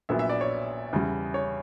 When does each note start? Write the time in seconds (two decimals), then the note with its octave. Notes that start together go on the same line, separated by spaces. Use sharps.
0.09 A#1 A#2 F#3 B3 E5
0.19 E5
0.29 D5
0.41 C#5
0.93 E2 C#3 G3
1.34 C#5